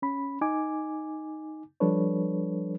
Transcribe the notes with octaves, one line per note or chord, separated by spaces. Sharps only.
C#4 B5
D#4 G#5 D6
F3 G3 D4 A4 B4 C#5